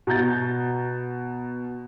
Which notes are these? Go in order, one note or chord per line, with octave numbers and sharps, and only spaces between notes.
B2 A#5 G6 A6